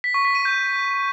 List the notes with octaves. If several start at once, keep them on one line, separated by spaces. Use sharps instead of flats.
B6
C#6
B6
D#7
G6